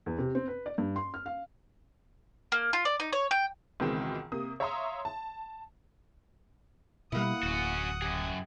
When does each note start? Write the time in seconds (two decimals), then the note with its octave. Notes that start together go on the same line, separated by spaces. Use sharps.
0.06 E2
0.19 C3
0.35 C4
0.48 B4
0.66 D5
0.78 G2
0.96 C6
1.14 F6
1.26 F5
2.52 A#3
2.73 F4
2.85 D5
3.00 D#4
3.13 C#5
3.31 G5
3.80 C#2 B2 D#3 E3 G#3 C4
4.32 C3 A#3 D#6
4.60 C#5 E5 F5 A#5 C6 D#6
5.05 A5
7.12 B2 G3 A#3 E4 F#5 D#6
7.43 D1 C#4 F#4
8.02 F#2 G4 G#4